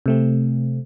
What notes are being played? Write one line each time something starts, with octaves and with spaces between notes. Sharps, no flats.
C3 A3 C4